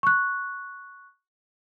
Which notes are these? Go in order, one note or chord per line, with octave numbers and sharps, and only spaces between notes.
C#6 F#6